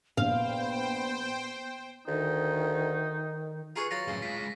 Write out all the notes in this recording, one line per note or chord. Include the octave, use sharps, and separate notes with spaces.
A#1 B3 C5 F5 G5
D2 D#3 D#4
F4 G#4 B4 A#5 C#6
F#3 F4 A6 A#6
F#2 A2 C#3
G#3 F4 B6